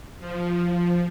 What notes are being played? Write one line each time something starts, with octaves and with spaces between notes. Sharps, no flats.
F3